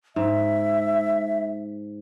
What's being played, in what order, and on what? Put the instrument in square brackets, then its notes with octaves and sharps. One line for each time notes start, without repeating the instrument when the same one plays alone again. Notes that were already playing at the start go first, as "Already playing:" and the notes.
[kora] G#2 [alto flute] E5